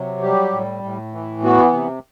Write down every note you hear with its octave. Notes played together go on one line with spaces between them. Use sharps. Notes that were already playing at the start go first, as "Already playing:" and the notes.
Already playing: C3 F#3
G3 G4
A2
A2
E3
B3 F#4
C3